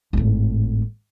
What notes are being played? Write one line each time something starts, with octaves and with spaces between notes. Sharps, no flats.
G#1 A2